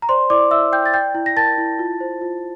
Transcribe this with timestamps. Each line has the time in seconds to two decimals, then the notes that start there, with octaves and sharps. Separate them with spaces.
0.02 A#5
0.09 C5 D5 C6
0.30 E4 D5 D6
0.51 E4 E5 E6
0.72 E4 G5 G6
0.86 A6
0.93 D5 G5 G6
1.14 E4
1.26 A#6
1.37 A#4 A5 A6
1.58 E4
1.79 F4
2.01 C5
2.21 F4